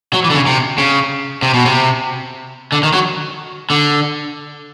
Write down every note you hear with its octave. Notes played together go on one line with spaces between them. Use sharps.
F#3
E3
D3
C#3
C3
C#3
C3
B2
C3
D3
D#3
F#3
D3